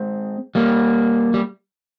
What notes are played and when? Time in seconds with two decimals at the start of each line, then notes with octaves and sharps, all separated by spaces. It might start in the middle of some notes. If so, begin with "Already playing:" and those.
Already playing: G#3 C4
0.55 G3 A#3
1.34 G3